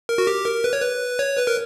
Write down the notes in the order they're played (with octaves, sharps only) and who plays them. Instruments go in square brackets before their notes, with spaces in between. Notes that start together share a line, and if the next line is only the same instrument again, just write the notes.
[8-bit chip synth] A#4
F#4
G4
A#4
B4
C#5
B4
C#5
B4
A#4